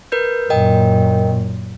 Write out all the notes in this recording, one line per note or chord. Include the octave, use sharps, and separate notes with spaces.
A#4 B4 G6
F#2 A#2 A#4 D#5 G5